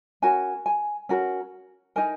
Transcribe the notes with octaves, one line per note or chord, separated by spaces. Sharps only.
C#4 F#4 A#4 G#5
G#5
C#4 F#4 A#4
D#4 A#4 G#5